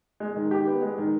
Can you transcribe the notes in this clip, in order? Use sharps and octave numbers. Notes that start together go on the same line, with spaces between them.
G#3
D#3
G4
B3
G#3
D#3